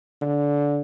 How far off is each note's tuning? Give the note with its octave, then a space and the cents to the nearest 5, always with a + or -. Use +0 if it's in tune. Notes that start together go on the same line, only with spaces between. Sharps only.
D3 -20